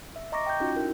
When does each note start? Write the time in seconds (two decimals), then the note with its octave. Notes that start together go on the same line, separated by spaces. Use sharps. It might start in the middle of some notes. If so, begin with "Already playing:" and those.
0.16 E5
0.32 D#5 A#5 C#6 D6 A#6
0.46 G5 G6
0.60 C#4 D#4 F4 F#4
0.76 D#4 E4 A#4